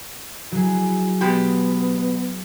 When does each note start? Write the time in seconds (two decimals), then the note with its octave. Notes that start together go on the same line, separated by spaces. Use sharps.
0.52 F#3 E4 G#4
1.21 B2 G#3 B3 G4